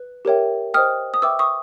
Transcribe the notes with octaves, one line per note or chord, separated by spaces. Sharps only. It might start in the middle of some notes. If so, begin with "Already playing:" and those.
Already playing: B4
G4 A#4 C#5 E5 G5
C5 D#5 G5 D#6 F6
D#6
B4 E5 G5 D6 E6
C#6 D#6